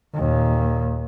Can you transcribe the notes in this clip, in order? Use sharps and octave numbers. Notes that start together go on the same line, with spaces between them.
D#2 A#2